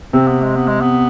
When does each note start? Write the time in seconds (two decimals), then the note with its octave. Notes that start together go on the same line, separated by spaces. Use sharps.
0.13 C3 C4
0.28 B3
0.42 G#3
0.56 B3
0.68 G#3
0.81 B3